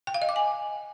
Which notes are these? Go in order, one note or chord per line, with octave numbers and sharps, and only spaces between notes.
G5
F5
D#5
D6
G#5